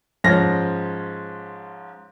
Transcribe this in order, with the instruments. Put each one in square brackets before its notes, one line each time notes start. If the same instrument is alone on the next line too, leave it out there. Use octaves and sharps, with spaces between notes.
[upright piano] G#2 F3 C#4 F6 A#6